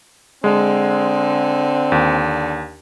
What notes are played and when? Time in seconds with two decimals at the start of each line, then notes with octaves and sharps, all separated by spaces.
0.44 D3 G#3 C4
1.92 D#2